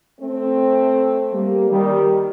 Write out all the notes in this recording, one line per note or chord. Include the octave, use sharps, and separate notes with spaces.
A3 C4
G3 A#3
D#3 G3